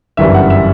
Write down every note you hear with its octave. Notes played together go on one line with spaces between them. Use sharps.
G1 F#2 E3 G3 E5
F#5
E5